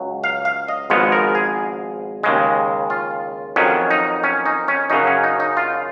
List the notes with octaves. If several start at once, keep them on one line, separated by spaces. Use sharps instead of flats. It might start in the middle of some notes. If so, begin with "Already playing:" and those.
Already playing: C#2 F#3
F5
F5
D#5
G#1 G#2 F3 G#3 B3 C#5
A#4
G#4
D#2 C#3 G#3
F4
F2 D#3 F#3 C#4
D#4
C#4
D#4
C#4
F#2 C#3 F#3 D#4
C#4
D#4
D#4
F4